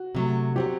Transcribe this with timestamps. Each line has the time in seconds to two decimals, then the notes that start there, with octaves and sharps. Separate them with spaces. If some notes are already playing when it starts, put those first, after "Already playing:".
Already playing: F#4
0.15 C3 F#3 A3
0.56 F#3 C4 F#4 G4